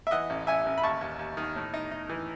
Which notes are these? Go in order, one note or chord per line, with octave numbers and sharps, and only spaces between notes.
E5
E3 D#5 F#5
A1
A1 E5 G#5
A1
B5
D#2 A5 C#6
D#2
D#2
D#3
A2
D#4
D#4
E3